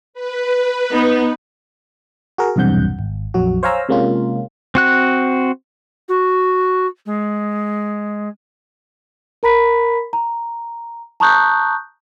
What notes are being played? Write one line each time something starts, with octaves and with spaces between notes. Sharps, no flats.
B4
B3 D#4
F#4 G#4 A#4
B1 E2 G2 C3 F#5 G6
G#1
A#1 F2 F#3 F#4
C5 C#5 F5 G#5 A#5 E6
C3 G#3 A#3 C#4 F4
C4 F#4 F#6
F#4
G#3
A#4 A#5 B5 B6
A#5
A5 A#5 C#6 D#6 F#6 G6